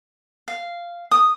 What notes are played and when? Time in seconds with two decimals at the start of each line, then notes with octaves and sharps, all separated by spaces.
0.48 F5
1.11 D#6